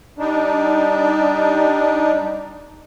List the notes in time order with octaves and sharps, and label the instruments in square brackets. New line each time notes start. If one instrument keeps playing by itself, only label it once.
[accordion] G3 D4 D#4